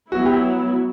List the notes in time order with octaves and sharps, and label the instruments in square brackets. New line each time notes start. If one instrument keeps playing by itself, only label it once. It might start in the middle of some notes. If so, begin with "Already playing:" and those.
[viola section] F#3 B3 E4 [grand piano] F#4
[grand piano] G4